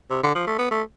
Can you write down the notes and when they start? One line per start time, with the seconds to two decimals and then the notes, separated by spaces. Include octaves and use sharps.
0.10 C3
0.23 D3
0.35 F3
0.47 A3
0.58 B3
0.71 A3